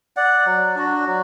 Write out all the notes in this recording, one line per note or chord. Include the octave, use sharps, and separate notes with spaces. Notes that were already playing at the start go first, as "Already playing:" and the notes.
D5 F#5
F#3
D4 F#4
F#3